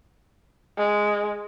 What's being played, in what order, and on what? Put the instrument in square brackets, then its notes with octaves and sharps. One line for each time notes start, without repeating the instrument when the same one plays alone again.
[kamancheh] G#3